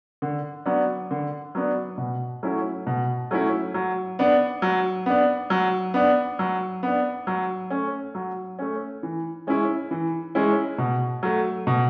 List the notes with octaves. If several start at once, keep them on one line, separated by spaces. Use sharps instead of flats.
D3
F#3 B3 D4
D3
F#3 B3 D4
B2
F#3 A3 C#4 E4
B2
F#3 A3 C#4 E4
F#3
B3 D4
F#3
B3 D4
F#3
B3 D4
F#3
B3 D4
F#3
A3 C#4
F#3
A3 C#4
E3
G#3 C#4 E4
E3
G#3 C#4 E4
B2
F#3 A3
B2